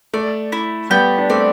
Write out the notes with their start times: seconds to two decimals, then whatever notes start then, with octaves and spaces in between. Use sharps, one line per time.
0.14 A3 D5
0.52 E4
0.90 G3 B3 G4
1.18 D4
1.30 A3 C4 D5